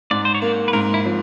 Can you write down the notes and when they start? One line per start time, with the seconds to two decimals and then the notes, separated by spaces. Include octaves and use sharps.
0.11 G#2 D5
0.25 C5
0.35 C#5
0.42 A#3 D5
0.68 B4
0.73 G#2 A#4
0.94 E4
1.05 F3